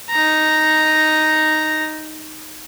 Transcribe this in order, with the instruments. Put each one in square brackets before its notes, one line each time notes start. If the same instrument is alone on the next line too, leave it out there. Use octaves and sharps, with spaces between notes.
[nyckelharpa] D#4 A#5